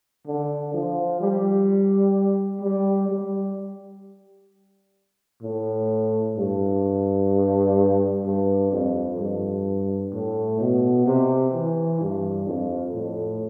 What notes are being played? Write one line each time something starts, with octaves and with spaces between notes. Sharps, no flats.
D3
F3
G3
G3
G3
A2
G2
G2
F2
G2
A2
B2
C3
E3
G2
F2
A2